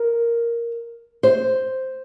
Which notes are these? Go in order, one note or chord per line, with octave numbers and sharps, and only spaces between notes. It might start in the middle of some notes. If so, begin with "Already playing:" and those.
Already playing: A#4
C5